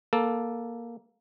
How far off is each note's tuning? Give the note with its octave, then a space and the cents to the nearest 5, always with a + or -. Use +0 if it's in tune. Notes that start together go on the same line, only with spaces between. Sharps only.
A#3 +10 A4 +0